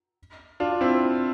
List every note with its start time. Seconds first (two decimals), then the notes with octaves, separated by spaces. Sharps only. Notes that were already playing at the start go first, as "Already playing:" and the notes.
0.60 D4 F4
0.81 C4 E4